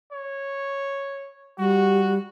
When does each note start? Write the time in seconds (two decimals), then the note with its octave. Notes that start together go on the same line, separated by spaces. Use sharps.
0.13 C#5
1.58 G3 F#4